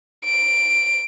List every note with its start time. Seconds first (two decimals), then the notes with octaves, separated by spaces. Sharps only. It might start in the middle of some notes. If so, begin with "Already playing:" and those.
0.25 D7